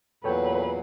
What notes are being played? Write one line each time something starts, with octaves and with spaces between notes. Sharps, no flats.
E2 A#2 F#3 A4 B4 C#5 G5